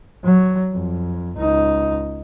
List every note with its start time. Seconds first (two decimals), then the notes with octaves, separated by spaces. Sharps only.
0.24 F#3
0.74 F2
1.38 C#2 D#4